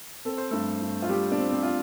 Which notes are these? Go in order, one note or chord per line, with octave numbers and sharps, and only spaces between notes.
C4 A4
C5
G2 A3 A4
G2
F4
G3 G4
D4
C4
C4
F4